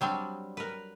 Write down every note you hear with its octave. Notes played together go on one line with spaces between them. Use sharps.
F#3 G3 C4 D4
A#4 B4